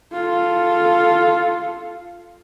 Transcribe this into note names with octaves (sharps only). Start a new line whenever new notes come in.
F4 A4